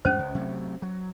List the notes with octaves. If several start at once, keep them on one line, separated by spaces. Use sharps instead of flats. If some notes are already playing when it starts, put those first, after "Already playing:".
F2 G#2 G3 C#4 C5
C#2
C3 F#3 A3
F#3